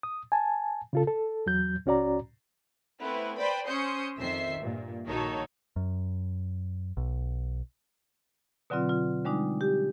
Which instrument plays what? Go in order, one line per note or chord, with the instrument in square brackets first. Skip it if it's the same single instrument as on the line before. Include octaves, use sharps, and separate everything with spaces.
[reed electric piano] D#6
G#5 A5
C#3 F4 A4
A4
E2 F#3 G6
C#2 C#4 F#4 D5 A#5
[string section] A3 B3 C4 E4 B4
B4 C5 D5 G5 B5
C#4 C5 C6 D#6 G6 C#7
F2 D#3 C5 E5 C7
G2 A#2
A#1 D#3 D#4 F#4 A4 C#5
[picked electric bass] F#2
B1
[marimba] B2 D3 F#3 C4 F4
F4
D3 G3 G#3 D4 D#4
G4